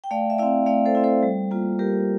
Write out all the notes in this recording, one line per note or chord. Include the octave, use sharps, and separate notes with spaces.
G5
A3 D5 F5
E5
C4 E4 D5 F5
A3 D5 F5
A4 C5
C4 E4
A4 C5
G3
A#3 F4
G3 G4 A#4